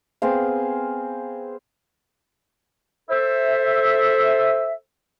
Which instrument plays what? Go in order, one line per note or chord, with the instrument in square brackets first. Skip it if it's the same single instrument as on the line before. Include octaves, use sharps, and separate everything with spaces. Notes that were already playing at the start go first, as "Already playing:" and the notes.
[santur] B3 C4 G#4 F5
[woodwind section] A4 C5 E5